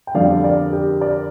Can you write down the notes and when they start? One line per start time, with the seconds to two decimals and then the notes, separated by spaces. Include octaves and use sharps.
0.07 G5
0.14 F2 D3 G3 D5 F5
0.44 A#4 D5
0.72 G4 A#4
1.01 A#4 D5